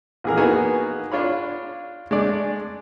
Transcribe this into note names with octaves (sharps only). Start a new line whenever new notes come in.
A#1 E3 G#4 A#4
A#3 B3 D#4 F#4 G#4 G#5
D4 F4 C#5 B5
G#3 A3 D4 D5